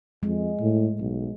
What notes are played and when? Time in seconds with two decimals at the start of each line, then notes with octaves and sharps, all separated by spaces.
0.23 F2 G#3
0.60 A2
1.00 B1